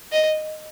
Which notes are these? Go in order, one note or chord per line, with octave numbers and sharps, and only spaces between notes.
D#5